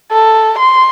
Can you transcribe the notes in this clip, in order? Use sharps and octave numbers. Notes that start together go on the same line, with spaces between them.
A4
C6